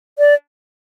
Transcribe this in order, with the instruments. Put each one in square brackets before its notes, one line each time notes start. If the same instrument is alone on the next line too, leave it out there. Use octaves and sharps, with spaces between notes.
[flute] D5